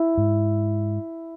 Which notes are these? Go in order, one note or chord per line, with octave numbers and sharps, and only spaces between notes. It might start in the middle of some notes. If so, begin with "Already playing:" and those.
Already playing: E4
G#2